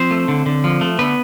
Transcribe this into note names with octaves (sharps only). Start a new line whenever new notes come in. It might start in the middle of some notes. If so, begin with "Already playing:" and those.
Already playing: F3 C4 C5
A3
D3
D3
F3
A3
D3 B3 B4